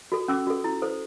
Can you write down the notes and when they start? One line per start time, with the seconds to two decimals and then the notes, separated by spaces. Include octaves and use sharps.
0.12 F#4 A4
0.28 C#4 D6 E6
0.47 F#4 A4
0.64 E4
0.82 A4 C5